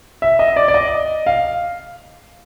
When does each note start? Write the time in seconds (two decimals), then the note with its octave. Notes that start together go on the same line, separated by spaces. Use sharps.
0.22 E5
0.39 D#5
0.56 D5
0.68 D5
0.74 D#5
1.27 F5